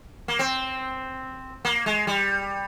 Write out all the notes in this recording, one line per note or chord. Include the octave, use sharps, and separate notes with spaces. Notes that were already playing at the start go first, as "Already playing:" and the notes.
A#3
C4
A#3
G#3
G3